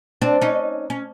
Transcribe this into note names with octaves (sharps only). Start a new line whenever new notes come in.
C4 D4
C#4 D#4
C#4